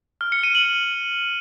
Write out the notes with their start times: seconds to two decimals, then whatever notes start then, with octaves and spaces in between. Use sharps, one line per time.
0.21 F6
0.32 C#7
0.43 D#7
0.55 F#7